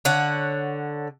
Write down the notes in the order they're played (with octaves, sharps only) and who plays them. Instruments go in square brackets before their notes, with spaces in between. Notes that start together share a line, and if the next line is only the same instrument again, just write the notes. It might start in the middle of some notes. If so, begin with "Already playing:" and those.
[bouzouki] D3 C#5 F#5